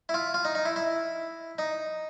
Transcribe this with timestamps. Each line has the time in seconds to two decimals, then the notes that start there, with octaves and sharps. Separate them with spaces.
0.09 E4
0.14 F4
0.34 F4
0.45 D#4
0.55 D#4
0.65 E4
0.76 E4
1.58 D#4